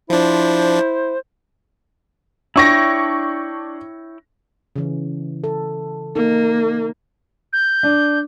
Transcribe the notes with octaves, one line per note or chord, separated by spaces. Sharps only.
F3 D4 E4 C5
D4 E4 C#5 G5 C#6 A#6
C#3 E3
A4
A#3 D#4
G6
D4